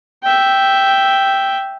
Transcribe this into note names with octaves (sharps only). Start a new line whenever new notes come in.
E5 G5